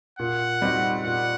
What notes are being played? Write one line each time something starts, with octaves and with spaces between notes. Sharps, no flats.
A#2 F#5
G3 C4 D#4 F#4
A#2 F#5